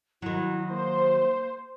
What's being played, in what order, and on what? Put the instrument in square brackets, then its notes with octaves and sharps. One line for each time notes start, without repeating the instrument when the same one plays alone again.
[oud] D#3 F#3 [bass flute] E4
[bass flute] A#3 [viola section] C5